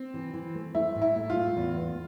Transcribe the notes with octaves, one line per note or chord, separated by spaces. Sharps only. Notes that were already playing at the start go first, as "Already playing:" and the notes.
Already playing: C4
E3
E3
A3
A3 E4
A2
E4
A3
F4
A3
E2
B3